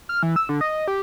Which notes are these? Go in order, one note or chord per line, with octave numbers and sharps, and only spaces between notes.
F6
E3
E6
D3
D#5
G4